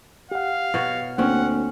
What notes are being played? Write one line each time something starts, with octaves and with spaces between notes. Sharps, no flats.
G4 F5 F#5
B2 F#4 C#5
D2 A#3 C4 C#4 F#5